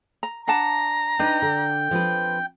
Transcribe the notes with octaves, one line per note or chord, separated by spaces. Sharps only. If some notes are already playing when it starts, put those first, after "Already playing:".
A#5
D4 F#5 A5 A#5
D4 D#4 B4 G5
D3
F3 C4 B4